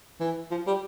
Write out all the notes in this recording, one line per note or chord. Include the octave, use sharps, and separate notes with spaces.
E3
F3
G3